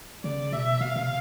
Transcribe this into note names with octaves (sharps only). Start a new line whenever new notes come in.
C#3 D5
B2 E5
B2 F5
C3